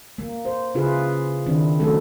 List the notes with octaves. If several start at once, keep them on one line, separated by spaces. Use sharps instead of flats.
A#3
C5
C#3 E4 F4 G#4 B4 F5
D#3 C4 D4 E4
F#3 A3 C4 C#4 D#4 A4